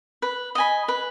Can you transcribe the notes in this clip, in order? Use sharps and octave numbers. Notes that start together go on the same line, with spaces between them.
B4
D#5 G#5 B5
B4